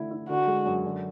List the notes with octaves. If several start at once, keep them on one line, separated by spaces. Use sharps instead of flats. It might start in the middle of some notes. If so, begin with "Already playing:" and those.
Already playing: D3 A3 E4
E4
D3 F#4
G#3
F#2
D3